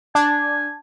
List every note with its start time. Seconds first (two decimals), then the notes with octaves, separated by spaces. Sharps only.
0.15 D4 G#5 A5